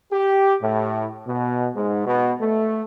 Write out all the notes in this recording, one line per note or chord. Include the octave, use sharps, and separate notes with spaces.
G4
A2
B2
G#2
B2
A3